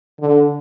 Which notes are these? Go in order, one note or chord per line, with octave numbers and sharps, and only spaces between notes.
D3